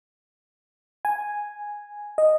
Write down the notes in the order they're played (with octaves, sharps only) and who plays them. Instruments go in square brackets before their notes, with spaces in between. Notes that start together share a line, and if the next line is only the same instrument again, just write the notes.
[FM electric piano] G#5
D#5